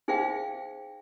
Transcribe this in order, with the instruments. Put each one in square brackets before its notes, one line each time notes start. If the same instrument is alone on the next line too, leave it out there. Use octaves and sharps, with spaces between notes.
[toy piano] D#4 G#4 C5 E5 F5 G5